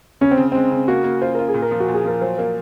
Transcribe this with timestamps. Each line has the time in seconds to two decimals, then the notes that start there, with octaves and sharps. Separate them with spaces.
0.21 C#3 C#4
0.31 C4
0.37 C#3
0.52 G#3 C4
0.71 C#3
0.88 A#3 F#4
1.04 A#3
1.21 F4 C5
1.35 F4 A#4
1.48 G#4
1.54 A#2
1.62 A#4
1.71 F3
1.80 F#4
1.88 A#2
1.94 G#4
2.05 F3 A#4
2.21 F#3 C5
2.38 A#3 A#4